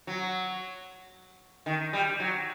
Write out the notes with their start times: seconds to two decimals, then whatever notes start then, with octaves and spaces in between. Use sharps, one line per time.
0.07 F#3
1.66 D#3
1.93 G3
2.20 F#3